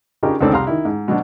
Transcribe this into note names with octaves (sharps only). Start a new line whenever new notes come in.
C#3 D4 D#4 F4 G4 A#4
C#2 D3 D#3 C4 A4 D5
C2 F5 A#5 C6 F6
D#3 E4
G#2
B2 F#3 D4